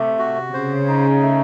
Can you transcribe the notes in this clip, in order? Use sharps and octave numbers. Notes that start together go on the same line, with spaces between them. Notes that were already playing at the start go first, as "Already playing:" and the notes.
Already playing: C3 A3
F#4
C#3 C5
D#4
A3